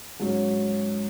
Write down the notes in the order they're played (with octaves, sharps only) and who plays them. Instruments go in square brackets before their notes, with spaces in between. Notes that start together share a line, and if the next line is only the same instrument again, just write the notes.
[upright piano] G#2 F#3 C#4